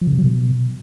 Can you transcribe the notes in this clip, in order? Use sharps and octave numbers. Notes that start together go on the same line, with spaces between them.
F3
C#3
C3
F#3
B2